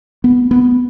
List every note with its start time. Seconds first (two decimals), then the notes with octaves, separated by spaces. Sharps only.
0.24 B3
0.51 B3